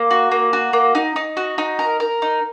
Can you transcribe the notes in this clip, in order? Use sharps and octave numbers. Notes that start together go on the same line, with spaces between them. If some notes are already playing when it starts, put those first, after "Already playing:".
Already playing: A#3
F#4
A#3
F#4
A#3
D#4
D#4
F#4
D#4
A#4
A#4
D#4